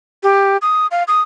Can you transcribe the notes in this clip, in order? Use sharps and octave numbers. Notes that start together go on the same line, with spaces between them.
G4
D#6
F5
D#6